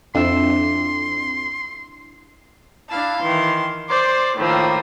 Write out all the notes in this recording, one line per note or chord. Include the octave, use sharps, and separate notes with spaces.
F2 D4 E4 E5 C6
D4 E4 F5 A5
D#3 E3 C6
C5 D5 C6 D6
A2 D#3 F3 A#3